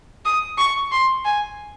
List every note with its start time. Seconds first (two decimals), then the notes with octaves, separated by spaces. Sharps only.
0.25 D#6
0.58 C#6
0.92 C6
1.25 G#5